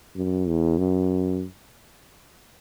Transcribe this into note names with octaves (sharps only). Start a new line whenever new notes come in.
F#2
E2
F#2